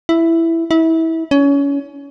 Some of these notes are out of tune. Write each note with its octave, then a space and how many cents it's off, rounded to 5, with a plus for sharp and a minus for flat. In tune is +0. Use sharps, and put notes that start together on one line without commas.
E4 +5
E4 -25
C#4 +25